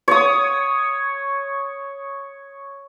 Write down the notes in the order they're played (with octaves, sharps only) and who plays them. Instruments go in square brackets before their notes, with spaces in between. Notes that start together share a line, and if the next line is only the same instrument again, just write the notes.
[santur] C#5 D#6